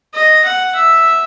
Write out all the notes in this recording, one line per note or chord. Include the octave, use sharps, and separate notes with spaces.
D#5
F#5
E5